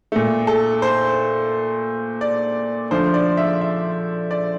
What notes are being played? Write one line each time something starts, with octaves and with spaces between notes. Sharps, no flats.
A#2 A3
A4
C5
D5
D3 F3 A3 C5
D5
E5
E5
D5